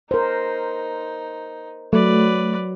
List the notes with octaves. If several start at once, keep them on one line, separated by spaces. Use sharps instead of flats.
D#4 A#4 C5
F#3 A3 B4 D5